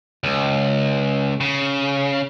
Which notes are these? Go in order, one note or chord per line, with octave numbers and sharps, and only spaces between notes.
C#2
C#3